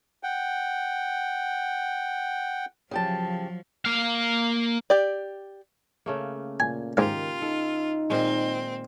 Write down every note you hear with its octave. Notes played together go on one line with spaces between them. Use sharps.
F#5 G5
C#3 F3 F#3 G4 A5
A#3 F5
G4 D5
C#3 A3 A#3
A#2 G#5
G#2 D#3 F4 G4 A#4 F5
D#4 A4
A#2 D#3 G#3 C4